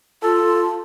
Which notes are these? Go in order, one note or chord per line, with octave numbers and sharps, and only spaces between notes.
F4 A4